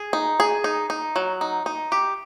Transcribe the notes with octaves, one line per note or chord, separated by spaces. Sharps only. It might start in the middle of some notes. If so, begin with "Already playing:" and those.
Already playing: G#4
D#4
G#4
D#4
D#4
F#3
D#4
D#4
G4